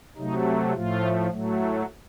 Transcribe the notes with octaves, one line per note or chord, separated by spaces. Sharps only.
C3 F#3 A3 D#4
A2 F3 A3 F4
A2 F#3 A3